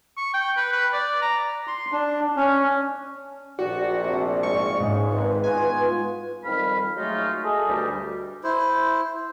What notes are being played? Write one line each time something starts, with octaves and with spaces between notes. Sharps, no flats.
C#6
G5
B4
B4
D5
A#5
C6
D4
C#4
A#1 F#4 G4 D5
C3 A5
G#2 E5 F5 C#6
C#2 G#2 G#4
G#1 B4
B3 F4 F#4 G#5
F2 D#3 G3 F5 B5
F#3 G#3 A3 D#4 F4
G#4 A4 D#5
D2 G2 G3
E4 C5